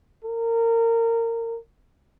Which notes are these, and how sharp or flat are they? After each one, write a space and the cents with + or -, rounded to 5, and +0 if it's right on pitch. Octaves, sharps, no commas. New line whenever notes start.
A#4 -25